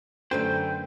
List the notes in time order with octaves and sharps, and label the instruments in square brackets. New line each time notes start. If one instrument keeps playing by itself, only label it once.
[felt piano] F#2 D3 [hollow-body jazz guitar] A3 B4 C5 [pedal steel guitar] G5